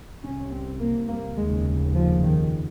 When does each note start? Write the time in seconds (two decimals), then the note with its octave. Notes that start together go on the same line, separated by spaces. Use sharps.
0.23 C2 C3 C#4
0.52 C4
0.80 A#3
1.09 A#3
1.37 F1 D#2 C#3 G#3
1.95 F3
2.23 D#3